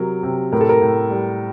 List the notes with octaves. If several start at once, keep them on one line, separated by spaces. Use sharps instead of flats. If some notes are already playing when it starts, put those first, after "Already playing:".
Already playing: C3 F#3 A#4
C3
A2 A#4
A4
A#4
A2
G3